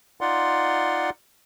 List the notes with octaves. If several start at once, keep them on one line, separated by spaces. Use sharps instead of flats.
D#4 F4 D5 F#5 C6